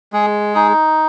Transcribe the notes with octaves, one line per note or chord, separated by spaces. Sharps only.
G#3 G#4
D#4 G#4